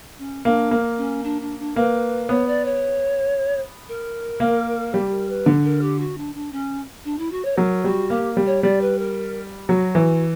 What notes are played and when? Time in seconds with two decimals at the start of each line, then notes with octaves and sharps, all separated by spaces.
0.18 C#4
0.45 A#3 D4
0.71 A#3
0.98 C#4
1.24 D4
1.41 D4
1.59 D4
1.76 A#3 B4
2.29 B3 C#5
2.47 D5
2.65 C#5
3.88 A#4
4.40 A#3
4.94 G3 G4
5.11 A#4
5.29 B4
5.46 D3
5.64 A#4
5.81 G4
5.99 F#4
6.17 D4
6.35 D4
6.52 C#4
7.04 D4
7.18 E4
7.31 F#4
7.45 C#5
7.57 F#3 A#4
7.84 G3 F#4
8.10 A#3 G4
8.37 G3
8.46 C#5
8.63 G3 D5
8.81 B4
8.99 A#4
9.69 F#3 F#4
9.95 E3